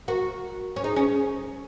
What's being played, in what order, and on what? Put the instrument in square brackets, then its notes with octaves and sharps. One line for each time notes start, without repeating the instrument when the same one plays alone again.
[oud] F#4 [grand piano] A#4
[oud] C#4
[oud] D#4 [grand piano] G#4
[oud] C#4